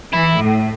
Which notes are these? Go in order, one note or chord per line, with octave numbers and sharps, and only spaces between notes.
E3 E4
A2